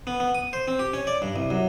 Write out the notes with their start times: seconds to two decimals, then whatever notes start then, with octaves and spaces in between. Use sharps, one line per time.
0.07 B3
0.20 B3
0.35 D#6
0.53 C5
0.68 C4
0.79 G4
0.94 C#4
1.07 D5
1.22 G2
1.36 C2
1.50 F#2